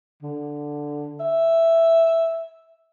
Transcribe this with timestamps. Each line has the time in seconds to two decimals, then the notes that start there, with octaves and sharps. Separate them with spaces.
0.23 D3
1.20 E5